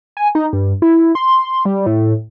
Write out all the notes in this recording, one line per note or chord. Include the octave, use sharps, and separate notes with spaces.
G#5
D#4
G2
E4
C6
G3
A2